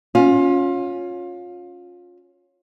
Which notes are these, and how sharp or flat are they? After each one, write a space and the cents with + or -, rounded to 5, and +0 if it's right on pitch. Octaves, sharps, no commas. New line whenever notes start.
C#4 +0 F4 +25